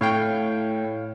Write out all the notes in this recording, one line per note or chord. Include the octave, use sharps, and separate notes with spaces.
A2 C#5 F5 G5